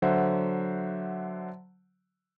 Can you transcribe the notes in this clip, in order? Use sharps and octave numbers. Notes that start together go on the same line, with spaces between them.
D3 F#3 C5 E5 F#5